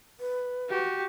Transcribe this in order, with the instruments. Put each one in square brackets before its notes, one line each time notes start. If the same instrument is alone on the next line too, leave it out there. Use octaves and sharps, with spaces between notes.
[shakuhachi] B4
[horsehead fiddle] F#4 G4